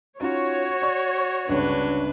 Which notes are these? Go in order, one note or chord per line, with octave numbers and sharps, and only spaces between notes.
C#4 D#4 F4 F#4 C#5
D5 C#6
G1 C#2 G2 D4 B4